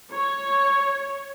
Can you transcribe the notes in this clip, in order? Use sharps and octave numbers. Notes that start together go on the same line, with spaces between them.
C#5